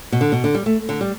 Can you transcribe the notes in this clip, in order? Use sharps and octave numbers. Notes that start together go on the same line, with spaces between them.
B2
D3
B2
D3
G3
A3
D3
G3